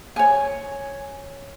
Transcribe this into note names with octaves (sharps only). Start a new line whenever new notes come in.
C#5 G#5